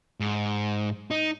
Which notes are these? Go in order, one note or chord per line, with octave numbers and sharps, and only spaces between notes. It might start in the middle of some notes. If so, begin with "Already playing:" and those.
G#2
D#4